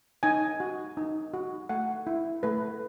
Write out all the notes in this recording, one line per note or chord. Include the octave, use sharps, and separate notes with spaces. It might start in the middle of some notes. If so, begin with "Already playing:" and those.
D#4 G#5
F#4
D#4
F#4
A3 F#5
E4
A3 B4